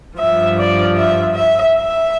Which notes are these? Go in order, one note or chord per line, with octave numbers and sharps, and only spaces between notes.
G2 F3 E5
D5
E5
E5
E5